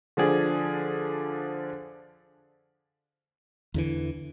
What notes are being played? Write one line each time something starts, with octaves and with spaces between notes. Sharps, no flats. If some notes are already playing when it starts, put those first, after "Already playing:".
D3 F3 D4 G#4
E2 D3 E3